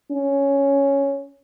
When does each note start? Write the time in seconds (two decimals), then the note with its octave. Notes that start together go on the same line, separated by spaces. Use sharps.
0.11 C#4